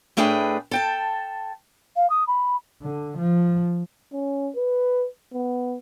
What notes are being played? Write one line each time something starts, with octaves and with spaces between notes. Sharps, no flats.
A2 A3 D4 G#4 B4 G5
A4 G5 A5
F5
D#6
B5
D3
F3
C#4
B4
B3